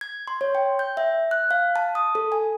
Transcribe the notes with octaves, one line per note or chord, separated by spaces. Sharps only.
G#6
C6
C#5
G5
G6
E5
F#6
F5
A5
D#6
A4
G#5